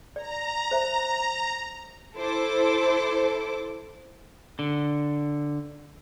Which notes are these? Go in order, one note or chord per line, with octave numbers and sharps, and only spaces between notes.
D5 A#5
C5 E5
E4 A4 C5 D6
D3